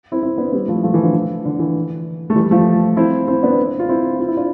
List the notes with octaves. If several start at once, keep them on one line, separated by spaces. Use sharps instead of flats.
C4 E4
C4 E4
B3 D4
G3 B3
F3 A3
F3 A3
E3
D3 F3
E3
D3
E3
A3
E3 G3
F3 A3
C4 E4
C4 E4
B3 D4
F4
C4 E4
F4
E4
D4 F4